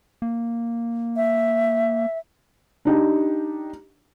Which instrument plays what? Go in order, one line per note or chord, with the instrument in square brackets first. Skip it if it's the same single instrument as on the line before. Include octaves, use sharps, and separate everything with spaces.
[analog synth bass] A#3
[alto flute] E5
[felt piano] D4 D#4 G4